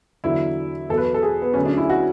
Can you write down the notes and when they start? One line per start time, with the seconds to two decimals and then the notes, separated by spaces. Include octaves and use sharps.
0.24 E2 D3 F#3 E4
0.89 E2 B2 F#3 A4
0.98 B4
1.14 A4
1.22 G#4
1.42 B3
1.54 D2 D3 F#3 C#4
1.65 D4
1.77 E4
1.90 F#4